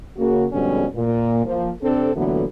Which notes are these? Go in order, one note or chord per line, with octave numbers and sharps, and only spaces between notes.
C#3 A#3 F#4
F2 G#2 B2 D3 G3 C#4
A#2
F3 A#3
C3 C4 D4 A4
A#2 D3 E3 F#3 A3 B3